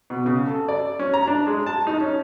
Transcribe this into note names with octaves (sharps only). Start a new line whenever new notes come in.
B2
C#3
A4
D5
C#4
A#5
D4
G#3
A5
D#4
C#4